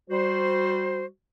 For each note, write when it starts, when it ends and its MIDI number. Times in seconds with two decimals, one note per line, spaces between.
0.10 1.05 55
0.10 1.05 66
0.10 1.05 72